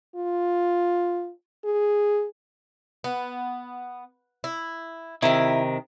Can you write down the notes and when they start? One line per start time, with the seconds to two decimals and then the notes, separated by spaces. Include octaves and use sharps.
0.16 F4
1.65 G#4
3.04 B3
4.44 E4
5.23 C3 D#3 E4 E5